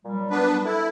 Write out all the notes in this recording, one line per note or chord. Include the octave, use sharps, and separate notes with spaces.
A#2 F#3 G3
B3 D4 B4
E4 A4